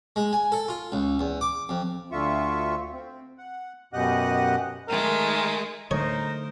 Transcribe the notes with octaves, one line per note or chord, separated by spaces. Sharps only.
G#3
G#5
A4
F4
C#2
E2
D6
F2
D2 D3 F4 E5 C#6
C4
F#5
F#2 B2 G4 D#5 F#5 F#6
D#3 G#3 A3 A#4
D3 A3 D#4 A#4 C5 C#5